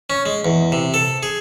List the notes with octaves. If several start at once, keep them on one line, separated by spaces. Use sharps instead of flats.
C#4
G#3
E2
C3
A4
G#4